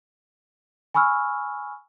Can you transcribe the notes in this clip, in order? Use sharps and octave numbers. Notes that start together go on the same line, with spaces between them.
G#5 B5 C#6 E6 F6